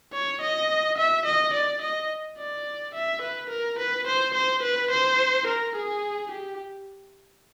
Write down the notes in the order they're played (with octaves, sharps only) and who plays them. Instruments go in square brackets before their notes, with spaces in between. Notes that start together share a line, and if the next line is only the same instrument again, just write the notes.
[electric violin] C#5
D#5
E5
D#5
D5
D#5
D5
E5
B4
A#4
B4
C5
C5
B4
C5
A#4
G#4
G4